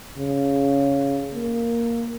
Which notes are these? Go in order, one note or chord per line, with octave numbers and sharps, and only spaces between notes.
C#3
A#3